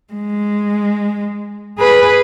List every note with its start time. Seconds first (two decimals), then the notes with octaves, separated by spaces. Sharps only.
0.13 G#3
1.79 G#4 B4